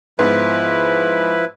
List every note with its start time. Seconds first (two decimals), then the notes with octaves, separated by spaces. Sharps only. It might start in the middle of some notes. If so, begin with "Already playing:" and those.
0.19 G#2 F3 B3 E4 B4